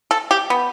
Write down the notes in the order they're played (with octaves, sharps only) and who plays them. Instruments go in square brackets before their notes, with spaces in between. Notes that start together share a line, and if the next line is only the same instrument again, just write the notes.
[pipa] A4
G4
B3